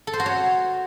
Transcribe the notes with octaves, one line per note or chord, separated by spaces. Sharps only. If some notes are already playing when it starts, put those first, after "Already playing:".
A4
C5
F#4
C#5